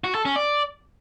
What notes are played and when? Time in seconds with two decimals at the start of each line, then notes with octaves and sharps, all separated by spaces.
0.04 F#4
0.15 A4
0.25 C#4
0.36 D5